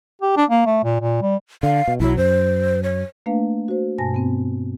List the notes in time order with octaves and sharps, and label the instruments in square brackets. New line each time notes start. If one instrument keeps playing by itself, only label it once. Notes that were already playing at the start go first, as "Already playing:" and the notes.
[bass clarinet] G4
D4
A#3
A3
A#2
A#2
G3
[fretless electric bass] D3 [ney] F5
[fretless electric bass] B2
[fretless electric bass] B1 F#3 [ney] E4
[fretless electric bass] F#2 [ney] C5
[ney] C#5
[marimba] A3 A#3 D4 B4 F5
F#4 C5
G2 B2 G#5 A5 A#6
B3 C4